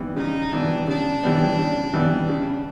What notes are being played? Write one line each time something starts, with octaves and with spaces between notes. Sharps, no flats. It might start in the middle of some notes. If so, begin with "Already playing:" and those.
Already playing: E3 G3 B3
C#3 D#4
E3 G3 B3 D4
C#3 D4
E3 G3 B3
C#3
E3 G3 B3
C#3